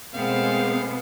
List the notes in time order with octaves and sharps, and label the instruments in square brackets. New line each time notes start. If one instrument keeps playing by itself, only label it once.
[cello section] B2 B3 C5 [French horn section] G#3 A3 A#4 [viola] C4 [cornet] F5